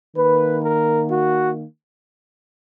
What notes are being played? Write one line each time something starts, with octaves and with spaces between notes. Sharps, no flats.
D#3 A#3 B4
A#4
F#4